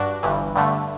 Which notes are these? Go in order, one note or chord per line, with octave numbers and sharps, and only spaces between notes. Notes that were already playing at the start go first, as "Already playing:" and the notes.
Already playing: G2 D4 F#4
G1 G2 E3
G2 D3 A3